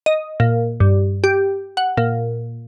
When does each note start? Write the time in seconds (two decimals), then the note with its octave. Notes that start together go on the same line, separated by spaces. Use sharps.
0.06 D#5
0.40 A#2
0.80 G2
1.24 G4
1.77 F#5
1.97 A#2